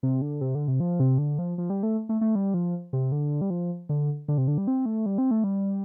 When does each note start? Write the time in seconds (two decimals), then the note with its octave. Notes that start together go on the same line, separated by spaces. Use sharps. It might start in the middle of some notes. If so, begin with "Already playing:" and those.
0.03 C3
0.22 D3
0.41 C3
0.55 D3
0.68 C3
0.80 F3
1.00 C3
1.18 D3
1.39 F3
1.58 F3
1.70 G3
1.83 A3
2.09 A3
2.21 A3
2.35 G3
2.54 F3
2.93 C3
3.12 D3
3.41 G3
3.50 F3
3.89 D3
4.28 D3
4.38 C3
4.48 D3
4.58 G3
4.67 C4
4.86 A3
5.06 G3
5.18 C4
5.31 A3
5.44 G3